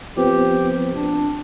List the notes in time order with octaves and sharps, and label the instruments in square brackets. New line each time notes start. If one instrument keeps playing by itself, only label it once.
[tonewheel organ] F3 B3 C4 [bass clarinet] G4
[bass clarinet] D4